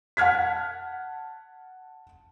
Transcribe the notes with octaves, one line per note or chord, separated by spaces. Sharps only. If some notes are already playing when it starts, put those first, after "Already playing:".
F#5 A5 F6 G#6 B6